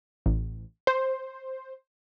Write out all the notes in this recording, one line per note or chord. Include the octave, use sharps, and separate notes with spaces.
A1
C5